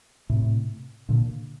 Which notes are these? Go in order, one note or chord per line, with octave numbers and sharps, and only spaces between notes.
A2 C3
A#2 D3